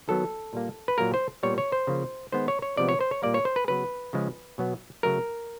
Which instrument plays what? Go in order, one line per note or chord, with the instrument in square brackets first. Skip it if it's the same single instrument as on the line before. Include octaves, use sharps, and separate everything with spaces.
[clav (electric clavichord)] D#3 F#3 B3 A4
A#2 G3 A#3
B4
A#2 F#3 A#3 A#4
C5
A#2 G3 B3 C#5
C#5
C5
C#3 F3 A#3
D#3 G#3 B3 C5
C#5
C#5
C3 F3 G#3 B3 D5
C#5
C5
C#5
A#2 G3 A#3 D5
C#5
C5
B4
C#3 F#3 B3 B4
C#3 F3 G#3
B2 F#3 B3
C#3 F#3 A3 A#4